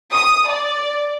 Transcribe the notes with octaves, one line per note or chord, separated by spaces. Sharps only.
D#6
D5